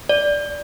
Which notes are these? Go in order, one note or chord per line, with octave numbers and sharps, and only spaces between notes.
D5